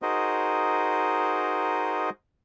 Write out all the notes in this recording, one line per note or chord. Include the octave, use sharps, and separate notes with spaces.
D#4 F#4 G#4 A#4 C5 D#5